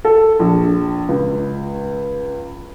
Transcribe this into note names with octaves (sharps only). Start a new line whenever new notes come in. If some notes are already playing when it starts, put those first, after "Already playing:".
A4
A#1
C#2